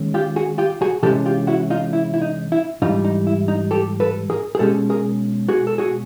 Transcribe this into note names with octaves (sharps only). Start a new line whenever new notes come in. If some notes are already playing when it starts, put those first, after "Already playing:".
Already playing: D#3 G#3 C#4
F4 G4
F#4 G#4
F4 G4
F#4 G#4
C3 E3 G#3 C#4 G4 A4
F4 G4
E4 F#4
D#4 F4
E4
E4
D#4
E4
G#2 E3 G3 D#4 F4
D#4
E4
D#4
G4 A4
A4 B4
G#4 A#4
G#4
B2 G#3 C#4 G4 A4
G#4 A#4
F#4 G#4
A4
F#4 G#4